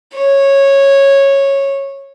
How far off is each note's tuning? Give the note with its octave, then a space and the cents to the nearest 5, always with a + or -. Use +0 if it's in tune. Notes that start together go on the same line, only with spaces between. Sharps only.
C#5 -10